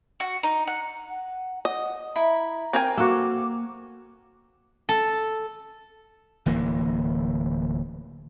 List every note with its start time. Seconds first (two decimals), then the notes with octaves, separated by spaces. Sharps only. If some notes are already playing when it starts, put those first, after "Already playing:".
0.20 F#4
0.43 D#4
0.67 F#5
1.09 F#5
1.65 D#5 F#5
2.16 E4 A#5 B5
2.73 C4 A#4 G5 G#5
2.97 A#3 F#4 A4 D6
4.89 A4
6.46 D1 E3 A#3